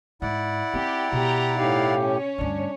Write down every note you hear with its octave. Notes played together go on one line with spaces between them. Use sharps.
G#2 E4 D5 F#5
C4 G4
B2 G4 A#5
A2 D#4 G4 F5
C#4 C#5
D2 G2 D4